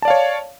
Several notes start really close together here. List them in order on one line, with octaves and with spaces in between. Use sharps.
A5 D5 F5 C#5